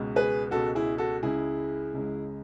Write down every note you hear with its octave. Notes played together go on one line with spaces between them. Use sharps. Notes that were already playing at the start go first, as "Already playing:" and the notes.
Already playing: C#2 B2 G#3
G#4 B4
C#2 B2 G#3 F#4 A4
E4 G#4
F#4 A4
C#2 C#3 G#3 E4 G#4
C#2 C#3 G#3